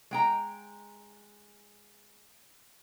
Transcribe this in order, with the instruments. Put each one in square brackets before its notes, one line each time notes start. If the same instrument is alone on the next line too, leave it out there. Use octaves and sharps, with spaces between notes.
[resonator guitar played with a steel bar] G#3 G5 A#5